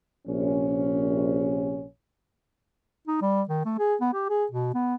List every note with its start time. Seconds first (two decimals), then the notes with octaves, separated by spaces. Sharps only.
0.26 A#1 C3 C#4
3.08 D#4
3.21 G3
3.49 D#3
3.65 A3
3.79 G#4
4.01 B3
4.14 G4
4.29 G#4
4.51 B2
4.74 B3